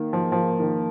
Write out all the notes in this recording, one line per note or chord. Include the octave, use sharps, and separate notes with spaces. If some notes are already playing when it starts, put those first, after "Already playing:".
Already playing: D#3 A#3
F3
F3
D#3